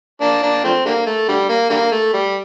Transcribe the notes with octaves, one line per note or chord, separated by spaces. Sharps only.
A#3 D4
A#3 D4
F3 A3 C4
D3 G3 A#3
A3
D3 G3
A#3
D3 G3 A#3
A3
G3